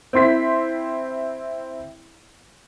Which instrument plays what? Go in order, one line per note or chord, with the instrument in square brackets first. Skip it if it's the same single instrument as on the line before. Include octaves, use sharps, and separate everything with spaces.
[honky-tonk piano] C4 E4 C6 B6